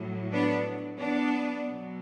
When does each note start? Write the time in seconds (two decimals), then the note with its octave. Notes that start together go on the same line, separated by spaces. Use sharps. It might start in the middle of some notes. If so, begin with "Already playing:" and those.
Already playing: A2 F#3
0.33 B3 D4
0.98 B3 D4
1.64 B2 F#3